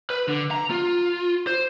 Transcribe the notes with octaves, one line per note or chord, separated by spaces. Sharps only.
B4
D3
A#5
F4
C5